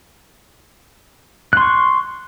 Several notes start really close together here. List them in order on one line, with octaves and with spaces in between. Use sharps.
F#6 C6 C#6